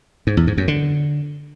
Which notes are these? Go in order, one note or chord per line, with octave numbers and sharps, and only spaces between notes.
G#2
E2
G#2
F#2
D3